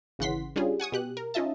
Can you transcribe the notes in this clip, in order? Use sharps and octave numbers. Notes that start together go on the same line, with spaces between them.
G#1 C#3 E3 F#5 C6 B6
G3 C#4 D4 F4 G#4
F#5 G#5 C#6 D#6
B2 G4 F#6
A#4
C#4 D#4 F4 D#5 E5 A5